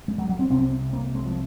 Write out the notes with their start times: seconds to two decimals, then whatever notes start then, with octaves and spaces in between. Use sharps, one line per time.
0.08 G#3
0.18 F#3
0.29 F#3
0.39 C4
0.50 C2 C3 C4
0.93 A#3
1.15 G#3
1.25 F3